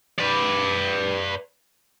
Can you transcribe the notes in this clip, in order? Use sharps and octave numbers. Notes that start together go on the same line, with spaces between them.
B4 D5